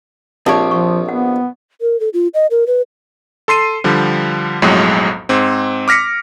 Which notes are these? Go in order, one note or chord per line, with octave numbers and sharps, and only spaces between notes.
A#1 C4 G4 C#5 A5
F3 C#6
B3 F#5
A#4
A4
F4
D#5
A#4
B4
A4 C6 C7 D#7
D3 F3 G3
B1 F2 A2 F#3 G#3
G#2 C4
D6 F6 A#6 B6 C#7